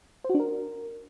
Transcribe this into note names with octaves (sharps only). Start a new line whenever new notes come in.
C5
F#4
D4
A#4